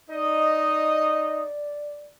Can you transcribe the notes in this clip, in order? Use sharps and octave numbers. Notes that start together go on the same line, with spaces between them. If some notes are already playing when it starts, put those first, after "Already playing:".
D#4 D5 D#5